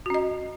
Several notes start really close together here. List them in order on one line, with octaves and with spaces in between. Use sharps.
F#4 C#4 D#5